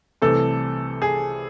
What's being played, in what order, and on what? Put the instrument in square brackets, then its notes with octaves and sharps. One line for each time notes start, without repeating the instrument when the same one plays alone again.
[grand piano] C2 C3 E3 A3 [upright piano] A4
[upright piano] G#4